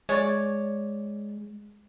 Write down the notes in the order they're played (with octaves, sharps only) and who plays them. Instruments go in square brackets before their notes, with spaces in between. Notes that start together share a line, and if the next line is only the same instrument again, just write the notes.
[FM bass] G#3 [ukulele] C#5 D5